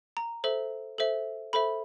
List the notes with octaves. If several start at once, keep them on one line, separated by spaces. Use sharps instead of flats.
A#5
A4 C5 E5
A4 C5 E5
A4 C5 E5 B5